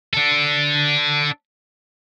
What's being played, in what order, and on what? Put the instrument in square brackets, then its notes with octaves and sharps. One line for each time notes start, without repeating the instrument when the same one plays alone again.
[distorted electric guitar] D4 A4